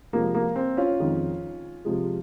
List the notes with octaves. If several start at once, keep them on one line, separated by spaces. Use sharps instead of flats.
C3 F3 G#3 A#3
A#3
C4
C#4 F4
F2 D#3 G#3
C3 F3 G#3